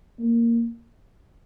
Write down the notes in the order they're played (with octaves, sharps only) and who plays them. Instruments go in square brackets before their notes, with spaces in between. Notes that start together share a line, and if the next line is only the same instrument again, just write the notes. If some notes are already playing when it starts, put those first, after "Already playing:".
[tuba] A#3